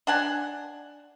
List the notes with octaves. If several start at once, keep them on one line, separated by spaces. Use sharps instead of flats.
D4 F#5 G#5